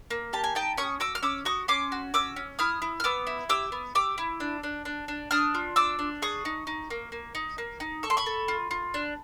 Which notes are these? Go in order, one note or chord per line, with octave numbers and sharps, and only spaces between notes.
A#3
G4 A5
G#5
D#4 G5 A5
C#4 C#6 D#6
F#4 D6 E6
F6
C#4 D6 E6
F#4 C#6 D#6
C#4 C6 D6
F#4
C#4 D6 E6
C#4
E4 D#6 F6
E4
F6
B3 D6 E6
E4
G4 D6 E6
B3
G4 D6 E6
E4
D4
D4
D4
D4
D4 D#6 F6
F4
D4 D6 E6
D4
G#4 C#6 D#6
D#4
D#4
A#3
A#3
D#4
A#3
D#4
A4 C#6
C6
B5 C#6
A4
F4
F4
D4